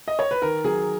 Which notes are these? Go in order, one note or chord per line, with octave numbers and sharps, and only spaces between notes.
D#5
C#5
B4
D#3 A#4
F#3 G#4